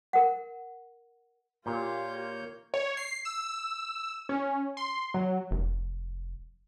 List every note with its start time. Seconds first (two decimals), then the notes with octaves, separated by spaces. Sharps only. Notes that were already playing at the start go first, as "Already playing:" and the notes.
0.13 A#4 F#5
1.66 A#2 A#3 F4 G4 C#5 G6
2.74 C#5
2.97 C7
3.25 E6
4.29 C#4
4.77 C6
5.14 F#3
5.51 F1